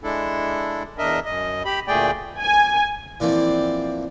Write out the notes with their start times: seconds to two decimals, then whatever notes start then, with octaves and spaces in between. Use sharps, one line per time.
0.04 G#3 D4 E4 A4
0.98 E2 D4 A#4 D#5 E5
1.25 F#2 D#5
1.65 G4 B5
1.88 D2 A#2 A3 G#4 D5 G5
2.37 G#5
3.20 A#2 E3 F3 C4 D5